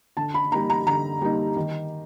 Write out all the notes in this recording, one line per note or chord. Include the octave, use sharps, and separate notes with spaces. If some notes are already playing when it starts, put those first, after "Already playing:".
D3 A5
B5
G3 A#3 D#4 A#5
A#5
D3 A#5
G3 A#3 D#4
D#3